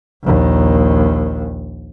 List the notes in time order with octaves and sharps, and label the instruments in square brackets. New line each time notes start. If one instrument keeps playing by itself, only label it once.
[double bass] A#1 D#2